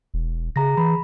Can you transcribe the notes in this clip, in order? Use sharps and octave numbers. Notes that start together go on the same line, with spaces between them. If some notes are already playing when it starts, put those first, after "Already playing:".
E1
C#3 G#4 A#5 A#6
E3 B5